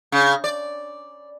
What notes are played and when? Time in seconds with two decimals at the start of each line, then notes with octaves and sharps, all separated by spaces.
0.12 C#3
0.44 D5